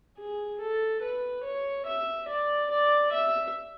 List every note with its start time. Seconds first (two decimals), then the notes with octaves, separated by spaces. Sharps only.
0.19 G#4
0.61 A4
1.02 B4
1.44 C#5
1.86 E5
2.28 D5
2.70 D5
3.13 E5